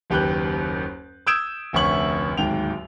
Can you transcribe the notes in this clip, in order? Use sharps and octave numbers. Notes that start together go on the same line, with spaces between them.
F#1 D#2 G4 B4 F#6 G6
D#6 E6 G6 G#6 D7 E7
F1 D2 C#4 E5 C#6 F#7
D1 D#2 G#2 G5 F7